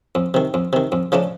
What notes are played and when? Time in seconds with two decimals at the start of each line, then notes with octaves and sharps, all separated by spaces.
0.15 F2
0.34 C3 D#3
0.54 F2
0.73 C3 D#3
0.92 F2
1.12 C#3 F3 A3 D4